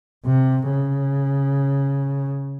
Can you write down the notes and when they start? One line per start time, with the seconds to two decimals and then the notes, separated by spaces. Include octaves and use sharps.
0.26 C3
0.70 C#3